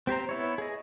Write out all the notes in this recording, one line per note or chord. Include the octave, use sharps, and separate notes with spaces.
C4 G4 C5 A#5
B3 E4 C#5
G#4 D#5